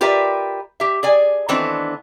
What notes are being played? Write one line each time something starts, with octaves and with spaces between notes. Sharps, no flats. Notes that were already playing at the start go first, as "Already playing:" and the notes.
F4 G4 A#4 B4 D5 E5
G4 E5
G#4 D5 G#5
D#3 E3 A3 B3 C4 D4